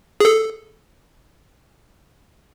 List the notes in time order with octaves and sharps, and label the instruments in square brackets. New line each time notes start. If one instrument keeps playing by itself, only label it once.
[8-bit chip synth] G#4 A4